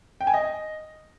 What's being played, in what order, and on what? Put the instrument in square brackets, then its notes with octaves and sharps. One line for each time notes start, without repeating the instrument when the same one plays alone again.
[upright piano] G5
G#5
D#5